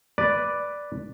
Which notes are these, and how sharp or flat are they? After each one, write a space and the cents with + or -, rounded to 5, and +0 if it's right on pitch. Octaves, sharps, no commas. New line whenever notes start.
B4 +0 D5 +0